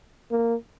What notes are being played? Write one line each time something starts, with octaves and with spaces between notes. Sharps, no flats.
A#3